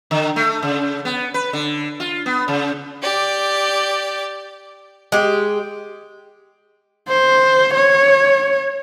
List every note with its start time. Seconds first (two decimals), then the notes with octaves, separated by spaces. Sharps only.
0.11 D3
0.36 A3
0.62 C#3
1.05 B3
1.34 B4
1.53 D3
2.00 F4
2.26 B3
2.48 C#3
3.02 G4 D5
5.12 G#3 G4
7.08 C5
7.74 C#5